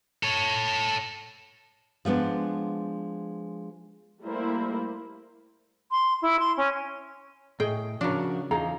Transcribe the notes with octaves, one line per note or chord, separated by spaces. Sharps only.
A4 C#5
F3 G#3 B3 D4
G3 A3 A#3 E4 A#4 C5
C6
E4
C6
C#4
A2 G#4 D#5 G5
C#3 F3 D4 F#4 A#4
E2 D#4 F4 G#4 A#5